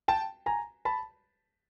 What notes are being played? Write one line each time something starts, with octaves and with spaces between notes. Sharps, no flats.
G5 A5
G#5 A#5
A5 B5